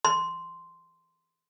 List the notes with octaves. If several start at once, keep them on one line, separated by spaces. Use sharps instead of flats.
C6